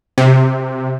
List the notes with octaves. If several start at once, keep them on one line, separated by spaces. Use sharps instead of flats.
C3